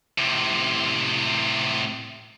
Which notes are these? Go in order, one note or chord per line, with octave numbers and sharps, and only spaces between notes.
A2 C3